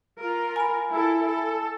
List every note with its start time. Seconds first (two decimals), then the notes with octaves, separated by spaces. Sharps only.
0.19 F4 A#4
0.56 G#5 B5
0.92 E4 A4
1.28 A4